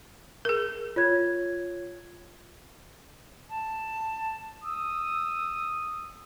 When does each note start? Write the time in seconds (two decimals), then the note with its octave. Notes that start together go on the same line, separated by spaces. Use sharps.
0.45 G#4 A#4
0.96 F4 C#5 G#6
3.49 A5
4.64 D#6 E6